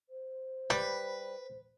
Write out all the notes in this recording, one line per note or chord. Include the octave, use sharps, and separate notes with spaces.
C5
G3 B4